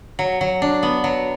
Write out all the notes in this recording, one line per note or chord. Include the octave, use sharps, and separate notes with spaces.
F#3
F#3
D4
B3
F#3